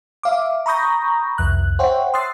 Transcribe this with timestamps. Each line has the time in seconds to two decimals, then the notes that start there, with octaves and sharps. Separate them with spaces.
0.23 E5 F5 D6
0.66 A#5 B5 C#6 D#6 G6 A#6
1.38 C2 F2 F#6
1.79 C5 C#5 E5 F#5 G5
2.14 C6 D#6 E6 F#6 A6 C7